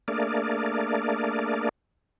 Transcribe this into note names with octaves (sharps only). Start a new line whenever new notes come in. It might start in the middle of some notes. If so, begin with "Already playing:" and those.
A3 A#3 D4 G#4 A#4 D5